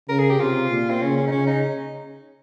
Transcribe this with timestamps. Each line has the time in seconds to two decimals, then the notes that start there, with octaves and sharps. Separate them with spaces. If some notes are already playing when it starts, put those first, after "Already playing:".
0.09 C#3 A#4
0.19 G#4
0.29 G4
0.39 C3 F4
0.70 A#2
0.90 C4
1.01 C#3 C#4
1.17 C#4
1.27 D#4
1.31 C#3 C#4
1.47 D#4